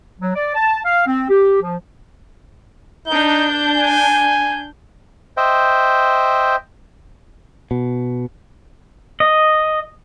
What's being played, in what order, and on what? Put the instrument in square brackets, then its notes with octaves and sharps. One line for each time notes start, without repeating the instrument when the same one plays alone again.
[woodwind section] F#3
D5
A5
F5
C4
G4
F3
[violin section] D4 G6 [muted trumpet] D#4
[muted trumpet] G#5
[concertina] C5 D#5 E5 G5
[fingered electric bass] B2
[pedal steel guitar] D#5